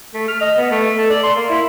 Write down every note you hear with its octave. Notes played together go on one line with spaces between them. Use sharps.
A3
F6
D#5
B3
A3
A4
D5
C6
A#3
E4